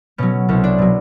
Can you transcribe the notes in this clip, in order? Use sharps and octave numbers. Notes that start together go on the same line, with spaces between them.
B2 F#3 C#4
C2 C#4
D4
B2 F#3